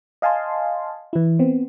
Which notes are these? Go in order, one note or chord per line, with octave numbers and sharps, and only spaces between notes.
D#5 F5 G#5 A5 C6
E3 E4
B3 C4